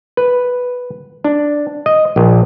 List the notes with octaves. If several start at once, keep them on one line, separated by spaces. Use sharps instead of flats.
B4
D4
D#5
A#1